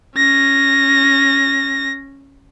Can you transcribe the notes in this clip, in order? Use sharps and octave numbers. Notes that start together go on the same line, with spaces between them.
C#4 A#6